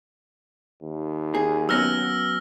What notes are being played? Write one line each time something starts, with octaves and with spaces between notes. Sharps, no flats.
D#2
G#4
F#3 B3 C#4 E6 F6 A#6